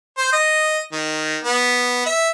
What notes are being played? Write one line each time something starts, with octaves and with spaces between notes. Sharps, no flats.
C5
D#5
D#3
B3
E5